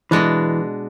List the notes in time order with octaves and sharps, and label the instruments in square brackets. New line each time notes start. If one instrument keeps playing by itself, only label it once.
[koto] B2 G#3 D4 [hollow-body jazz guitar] E3